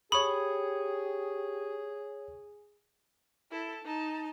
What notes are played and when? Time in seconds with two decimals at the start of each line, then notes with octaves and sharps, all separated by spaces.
0.12 G4 G#4 C#5 B5 C#6 D#6
3.51 E4 A4
3.84 D#4 A5